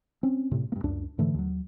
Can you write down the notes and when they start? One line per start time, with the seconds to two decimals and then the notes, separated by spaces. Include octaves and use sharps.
0.23 C4 C#4
0.51 A2 C3
0.72 G2 A#3
0.84 C#2 F#2 D4
1.18 G#2 D3 E3 A3
1.34 D#2 F#3